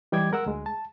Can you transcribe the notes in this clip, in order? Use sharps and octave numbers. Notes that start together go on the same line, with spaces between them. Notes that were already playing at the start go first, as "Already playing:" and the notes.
E3 G3 D#5 G5 D6 G#6
G#3 A#4 F#5 E6
D2 G#3
A5